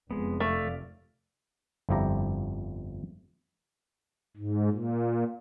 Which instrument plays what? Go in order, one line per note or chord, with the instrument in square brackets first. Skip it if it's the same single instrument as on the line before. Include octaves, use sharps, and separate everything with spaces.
[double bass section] F1 [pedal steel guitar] G#3 B3
[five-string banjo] A3 [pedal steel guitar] D5 F5
[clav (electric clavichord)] G1 F2 F3 E4 G4 A#5
[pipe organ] G#2
A#2